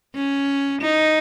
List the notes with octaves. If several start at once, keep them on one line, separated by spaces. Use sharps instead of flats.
C#4
D#4